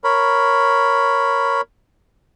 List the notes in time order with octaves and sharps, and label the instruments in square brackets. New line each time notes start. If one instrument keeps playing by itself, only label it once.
[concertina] A#4 C#5 B5